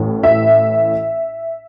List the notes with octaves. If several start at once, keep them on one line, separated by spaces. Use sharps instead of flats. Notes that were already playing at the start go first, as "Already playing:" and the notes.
Already playing: A1 A2 E3
E5